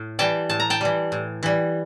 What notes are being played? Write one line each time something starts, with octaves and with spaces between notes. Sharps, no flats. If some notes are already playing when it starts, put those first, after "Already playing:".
Already playing: A2
E3 G3 G5 A5
A2 A5
A#5
G5 A5
E3 G3
A2
E3 G3